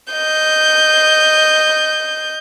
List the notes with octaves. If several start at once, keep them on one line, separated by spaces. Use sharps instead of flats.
D#5 G6